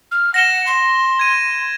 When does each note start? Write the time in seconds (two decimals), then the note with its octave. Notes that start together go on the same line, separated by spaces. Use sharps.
0.11 F6
0.34 F#5 A#6 E7 G7
0.66 C6
1.19 G#6 D#7